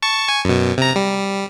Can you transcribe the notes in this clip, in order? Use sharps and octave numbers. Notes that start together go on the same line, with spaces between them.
A5 C#6
G#5 C#6
F#2 B2
C3 A#5
G3